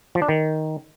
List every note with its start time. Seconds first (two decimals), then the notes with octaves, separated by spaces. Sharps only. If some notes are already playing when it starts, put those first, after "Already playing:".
0.15 F3
0.22 D4
0.29 D#3